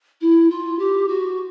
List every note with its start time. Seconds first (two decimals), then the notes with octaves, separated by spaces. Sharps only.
0.21 E4
0.50 F4
0.79 G4
1.08 F#4